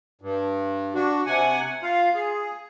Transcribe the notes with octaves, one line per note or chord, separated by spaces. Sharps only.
G2
D4 F#4
C3 F#5 G#5
F4 F5
G#4